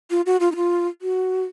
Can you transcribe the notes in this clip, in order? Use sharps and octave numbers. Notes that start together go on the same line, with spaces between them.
F4
F#4
F4
D#4
F4
F#4